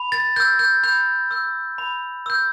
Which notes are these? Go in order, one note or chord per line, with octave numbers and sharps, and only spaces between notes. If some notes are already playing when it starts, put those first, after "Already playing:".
Already playing: B5
A6
E6 G6
G6
B5 G6
E6 G6
B5
E6 G6